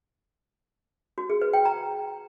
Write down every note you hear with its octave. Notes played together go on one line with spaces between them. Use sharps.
F#4
G#4
B4
G5
A#5